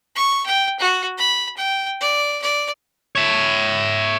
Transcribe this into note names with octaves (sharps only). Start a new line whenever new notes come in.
C#6
G5
F#4
B5
G5
D5
D5
C#5 E5